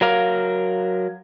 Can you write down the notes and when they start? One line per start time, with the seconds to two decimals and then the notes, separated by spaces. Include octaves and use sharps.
0.01 F#3 A#4 F5